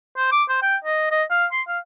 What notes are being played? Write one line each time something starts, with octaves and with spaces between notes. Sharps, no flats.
C5
D6
C5
G5
D#5
D#5
F5
C6
F5